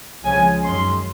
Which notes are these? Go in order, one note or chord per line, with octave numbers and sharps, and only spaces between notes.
C#2 C#3 F3 G#3 C#4 G#5
F#2 D#3 G#3 C#4 C6